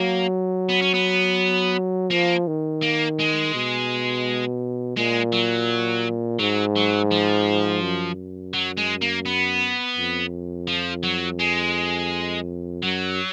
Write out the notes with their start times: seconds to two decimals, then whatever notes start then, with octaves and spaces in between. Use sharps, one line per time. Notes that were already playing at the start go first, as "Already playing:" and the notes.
Already playing: F#3 A#3
0.69 B3
0.82 C#4
0.94 B3
2.11 F3 A#3
2.47 D#3
2.82 A#3
3.19 G#3
3.54 B2
4.97 A#2 G#3
5.33 F#3
6.39 G#2 F#3
6.76 F#3
7.11 F3
7.82 F#2
8.54 F#3
8.78 G#3
9.02 A#3
9.26 B3
9.97 F2
10.68 F3
11.04 F#3
11.40 G#3
12.83 F#2 F#3